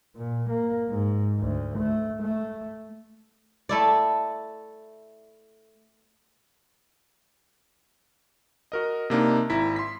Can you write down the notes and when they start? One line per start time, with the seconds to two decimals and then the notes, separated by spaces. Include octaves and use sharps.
0.17 A#2
0.49 A#3
0.89 G#2
1.40 D2
1.79 A3
2.22 A3
3.69 A3 E4 D5
8.72 F#4 A#4 D#5
9.10 C3 A#3 D4 D#4
9.50 G#1 E4 A#5 B6
9.76 C6 B6